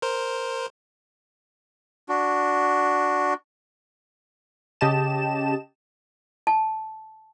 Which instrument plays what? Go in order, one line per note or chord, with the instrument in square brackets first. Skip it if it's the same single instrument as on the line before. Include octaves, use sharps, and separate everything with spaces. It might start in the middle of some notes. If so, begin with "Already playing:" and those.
[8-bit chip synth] A#4 C5
[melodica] D4 F#4
[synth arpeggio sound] C#3 G4 D#5 A5 E7
[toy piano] A5